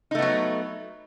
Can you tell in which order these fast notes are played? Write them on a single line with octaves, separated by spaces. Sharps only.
D#4 A3 B3 F#3